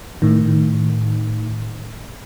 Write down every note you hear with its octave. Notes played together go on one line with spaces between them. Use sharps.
A2 D#3